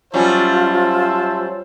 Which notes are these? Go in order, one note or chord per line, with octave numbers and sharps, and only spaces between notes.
F#3 G3 C#4 F4 C5 E5 A5